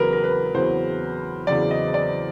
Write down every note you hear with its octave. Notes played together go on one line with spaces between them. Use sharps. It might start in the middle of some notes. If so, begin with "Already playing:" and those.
Already playing: E2 C#3 F#3 A#4 B4
A#4
B4
E2 C#3 F#3 C5
E2 C#3 F#3 D5
D#5
D5